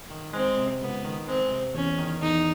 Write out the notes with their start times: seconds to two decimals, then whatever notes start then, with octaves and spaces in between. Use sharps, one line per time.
0.11 D#3
0.33 G#3 C4
0.57 C3
0.81 C#2 B3
1.05 D#3
1.28 G#3 C4
1.51 C3
1.75 E2 C#4
1.98 D#3
2.22 E2 D#4